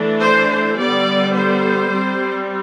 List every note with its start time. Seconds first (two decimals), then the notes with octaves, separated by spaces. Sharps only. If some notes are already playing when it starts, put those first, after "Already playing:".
Already playing: E3 A3 D4
0.21 C5
0.49 C5
0.77 D3 G3 B3 D5
1.33 C5
1.90 G3 C4